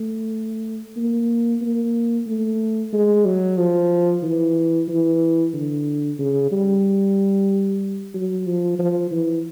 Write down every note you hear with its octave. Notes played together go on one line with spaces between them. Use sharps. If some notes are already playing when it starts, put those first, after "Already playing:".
Already playing: A3
A#3
A#3
A3
G#3
F#3
F3
E3
E3
D3
C#3
G3
F#3
F3
F3
E3